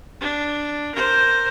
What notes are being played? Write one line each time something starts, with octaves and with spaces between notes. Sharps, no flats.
D4
A#4 C5